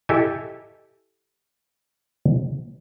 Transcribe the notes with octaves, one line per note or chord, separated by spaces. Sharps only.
E4 G4 A4 D#5 G#5